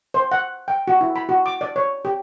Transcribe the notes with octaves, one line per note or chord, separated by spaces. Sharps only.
C5
F#5
G5
F#4
E4
B5
F#4
D6
D5
C#5
G4